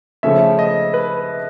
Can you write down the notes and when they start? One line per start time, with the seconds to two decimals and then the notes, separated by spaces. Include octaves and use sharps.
0.23 C#3 F3 A3 C#4 E5
0.59 D#5
0.94 B4